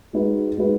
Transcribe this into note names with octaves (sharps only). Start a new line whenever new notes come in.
G#3 D#4 F#4 B4
G#3 D#4 F#4 B4